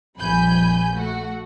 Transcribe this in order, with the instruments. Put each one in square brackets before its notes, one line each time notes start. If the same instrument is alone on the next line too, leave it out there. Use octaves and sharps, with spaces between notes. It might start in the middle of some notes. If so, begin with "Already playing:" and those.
[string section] A#1 F2 G3 G#5 B5 G6
A3 F#4